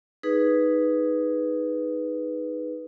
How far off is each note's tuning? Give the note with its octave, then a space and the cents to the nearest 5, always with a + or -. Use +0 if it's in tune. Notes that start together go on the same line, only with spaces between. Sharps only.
D#4 +0 G#4 +0 B4 +0